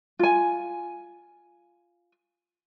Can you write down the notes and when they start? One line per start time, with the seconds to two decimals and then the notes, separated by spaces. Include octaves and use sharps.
0.19 F4 G#5